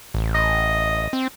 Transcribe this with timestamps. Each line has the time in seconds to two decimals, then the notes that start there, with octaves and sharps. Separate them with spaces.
0.14 A1
0.35 D#5
1.13 C4